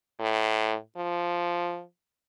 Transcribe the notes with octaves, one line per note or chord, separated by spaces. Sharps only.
A2
F3